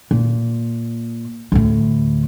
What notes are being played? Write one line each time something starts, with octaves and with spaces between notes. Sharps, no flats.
A#2
D2 A2